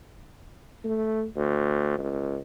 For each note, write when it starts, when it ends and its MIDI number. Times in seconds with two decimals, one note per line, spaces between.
0.84 1.25 57
1.35 1.94 38
1.99 2.38 37